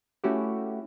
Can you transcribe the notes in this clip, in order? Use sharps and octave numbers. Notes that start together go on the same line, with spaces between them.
A3 C#4 E4 F#4 G4